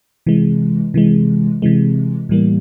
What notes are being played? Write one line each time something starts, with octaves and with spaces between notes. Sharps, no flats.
C3 E3 G#3
C3 E3 G#3
C3 E3 G#3
A2 E3 G3 A#3